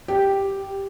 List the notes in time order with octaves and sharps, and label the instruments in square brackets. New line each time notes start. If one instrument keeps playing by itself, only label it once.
[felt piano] G4